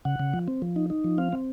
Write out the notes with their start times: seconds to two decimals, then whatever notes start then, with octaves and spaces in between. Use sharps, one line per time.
0.05 C#3 F#5
0.20 C#3
0.34 F3
0.48 C4
0.62 F3
0.76 D#4
0.90 D#4
1.04 F3
1.18 C4 F5
1.32 C4